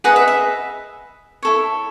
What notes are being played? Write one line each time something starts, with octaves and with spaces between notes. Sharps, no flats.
G#4 B4 D#5 F#5
E5
E5
E4 A4 C#5